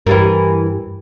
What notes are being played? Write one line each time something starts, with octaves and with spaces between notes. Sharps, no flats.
G2 E3 G3 A#4